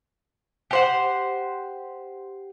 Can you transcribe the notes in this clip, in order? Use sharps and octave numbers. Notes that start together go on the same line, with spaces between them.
G4 C5 F#5